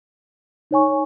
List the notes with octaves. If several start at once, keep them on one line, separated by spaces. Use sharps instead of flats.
D#4 C#5 G#5 C#6